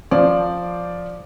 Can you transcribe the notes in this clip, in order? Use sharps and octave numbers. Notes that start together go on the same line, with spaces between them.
F3 C5 D5